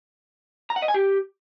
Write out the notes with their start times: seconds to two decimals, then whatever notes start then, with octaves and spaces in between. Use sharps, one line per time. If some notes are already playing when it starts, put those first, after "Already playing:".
0.70 A#5
0.76 F#5
0.82 D#5
0.88 G#5
0.94 G4